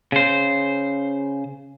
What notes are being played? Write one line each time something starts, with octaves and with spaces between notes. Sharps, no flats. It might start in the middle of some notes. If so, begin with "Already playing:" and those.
C#3 C5